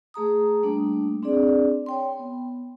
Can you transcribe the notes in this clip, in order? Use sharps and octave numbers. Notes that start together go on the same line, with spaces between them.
A3 G#4 A#5 D#6
G3 A3 A#3 D4
C4 D4 G#4 D5
C#5 G5 C6
B3